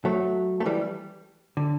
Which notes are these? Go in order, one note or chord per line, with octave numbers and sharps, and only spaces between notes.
F#3 A3
A3
E3 G3
D3